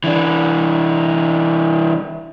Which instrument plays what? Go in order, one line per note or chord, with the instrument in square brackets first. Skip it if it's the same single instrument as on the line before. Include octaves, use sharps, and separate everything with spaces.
[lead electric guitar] E3 D4